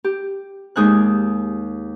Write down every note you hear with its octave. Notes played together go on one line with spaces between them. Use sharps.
G4
D#2 G#3 D#4 G#5 F#6